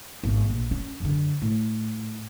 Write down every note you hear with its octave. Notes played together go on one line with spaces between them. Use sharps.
G#1 B3
A#1
C#4
F#2 D3
A2